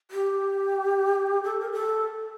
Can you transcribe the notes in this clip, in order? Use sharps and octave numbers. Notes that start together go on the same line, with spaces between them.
G4
A4
A#4
A4